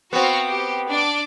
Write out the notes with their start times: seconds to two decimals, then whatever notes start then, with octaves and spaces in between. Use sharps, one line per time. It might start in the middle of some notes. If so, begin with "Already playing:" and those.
0.13 B3 C4 F#4 F5 C#6
0.50 G4
0.90 D4 D5 D6